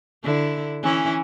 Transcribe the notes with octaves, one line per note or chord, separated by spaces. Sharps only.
D3 E4
E3 C#4 E4